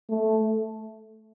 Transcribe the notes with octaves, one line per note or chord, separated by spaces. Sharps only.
A3